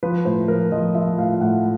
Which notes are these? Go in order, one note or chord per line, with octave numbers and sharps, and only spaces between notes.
F3 B4
A2 C5
F3 A#4
F3 D#5
F3 E5
A2 F5
F5
A2 F#5